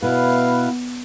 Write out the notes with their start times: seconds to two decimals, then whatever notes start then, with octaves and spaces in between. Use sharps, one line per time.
0.02 B2 E4 B4 F5